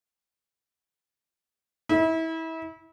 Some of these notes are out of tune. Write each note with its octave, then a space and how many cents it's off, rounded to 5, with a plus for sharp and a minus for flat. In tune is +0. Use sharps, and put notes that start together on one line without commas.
E4 -30